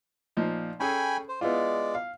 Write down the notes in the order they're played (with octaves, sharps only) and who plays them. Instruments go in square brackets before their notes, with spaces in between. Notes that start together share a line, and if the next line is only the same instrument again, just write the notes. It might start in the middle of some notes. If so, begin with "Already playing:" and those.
[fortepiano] A#2 F3 D#4
[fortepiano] C#4 G#4 A4 [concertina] G5 G#5 B5
[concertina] C5
[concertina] G#3 D5 [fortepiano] B3 E4 F4
[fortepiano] F5